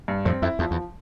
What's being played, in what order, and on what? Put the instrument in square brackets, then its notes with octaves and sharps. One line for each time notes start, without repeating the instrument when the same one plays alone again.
[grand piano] G2
[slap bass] F2 A2 [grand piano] C4
[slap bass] F2 [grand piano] E4
[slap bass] E2 [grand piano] F3
[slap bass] E2